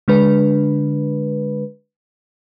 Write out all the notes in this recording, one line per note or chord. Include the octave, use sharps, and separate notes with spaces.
D3 G#3 D4 B4